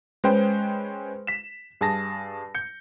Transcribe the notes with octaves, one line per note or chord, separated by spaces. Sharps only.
G#3 C#4 B4 C5 G5
B6 E7
G2 G#4 A5 A#6
G6 C#7